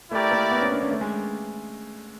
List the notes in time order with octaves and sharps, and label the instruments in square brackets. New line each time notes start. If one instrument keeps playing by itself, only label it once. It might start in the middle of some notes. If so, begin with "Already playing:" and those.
[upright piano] A3 [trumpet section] E4 G4 A#4 D5
[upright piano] A#3
B3
C#4
D4
C#4
A3
G#3